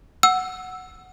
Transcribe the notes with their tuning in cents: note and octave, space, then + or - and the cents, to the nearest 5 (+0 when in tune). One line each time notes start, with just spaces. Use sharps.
F#5 +0 E6 +0